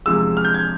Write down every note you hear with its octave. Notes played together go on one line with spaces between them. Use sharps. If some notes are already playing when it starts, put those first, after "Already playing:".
E2 C3 F3 G#3 E6
F6
G6
G#6